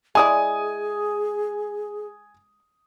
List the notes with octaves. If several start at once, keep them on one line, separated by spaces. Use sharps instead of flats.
G#3 E4 G#4 D5 G#5 D#6